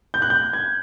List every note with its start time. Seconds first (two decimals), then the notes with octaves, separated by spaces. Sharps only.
0.14 G6
0.22 F#6
0.30 G6
0.53 G#6